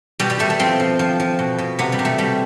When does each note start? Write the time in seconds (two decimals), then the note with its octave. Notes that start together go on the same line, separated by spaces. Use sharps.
0.20 B2 G3
0.30 G3
0.39 B2 A3
0.50 A3
0.59 F3 C4
0.80 F3
0.99 F3
1.20 F3
1.39 B2
1.58 B2
1.79 C3 B3
1.92 G3
1.99 C3
2.05 A3
2.18 B2 G3